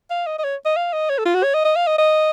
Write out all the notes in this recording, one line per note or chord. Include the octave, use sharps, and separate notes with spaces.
F5
D#5
D#5
C#5
D#5
F5
D#5
C#5
A4
F4
F#4
C#5
D#5
D#5
F5
D#5
D#5